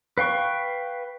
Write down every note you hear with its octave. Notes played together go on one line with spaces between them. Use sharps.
B4 F5 G5 C#6